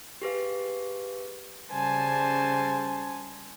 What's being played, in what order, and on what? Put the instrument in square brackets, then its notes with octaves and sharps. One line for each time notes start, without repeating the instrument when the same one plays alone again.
[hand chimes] G4 G#4 B4 F5
[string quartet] C#3 G3 C5 G#5 A5